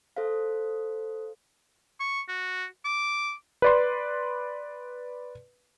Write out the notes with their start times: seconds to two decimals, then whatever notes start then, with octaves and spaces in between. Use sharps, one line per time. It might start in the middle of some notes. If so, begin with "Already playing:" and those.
0.16 A4 C5 F5
2.00 C#6
2.28 F#4
2.85 D6
3.62 B4 D5 C6